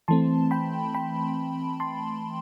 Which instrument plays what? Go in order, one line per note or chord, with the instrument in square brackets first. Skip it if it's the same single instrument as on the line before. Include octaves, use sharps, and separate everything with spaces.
[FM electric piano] E3 A3 C4 A5 C6
G5 B5
G5 B5
A5 C6